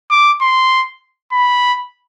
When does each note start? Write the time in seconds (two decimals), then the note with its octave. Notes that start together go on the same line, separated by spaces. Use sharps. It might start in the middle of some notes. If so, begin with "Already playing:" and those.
0.11 D6
0.41 C6
1.32 B5